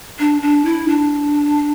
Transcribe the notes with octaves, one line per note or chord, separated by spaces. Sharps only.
D4
D4
E4
D4